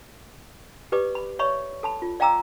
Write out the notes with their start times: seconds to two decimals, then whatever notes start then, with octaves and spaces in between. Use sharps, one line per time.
0.92 G4 B4 D5 D6
1.15 B5
1.39 C#5 D5 E5 B5 C#6
1.83 A4 A5 B5
2.02 F4
2.20 D5 F5 G5 A#5 D6 E6